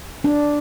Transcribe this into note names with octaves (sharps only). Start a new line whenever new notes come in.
D4